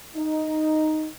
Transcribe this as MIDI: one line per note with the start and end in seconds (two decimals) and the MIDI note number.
0.16 1.08 63